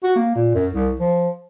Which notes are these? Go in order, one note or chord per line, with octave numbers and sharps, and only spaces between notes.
F#4
A#3
A#2
F#2
C2
F3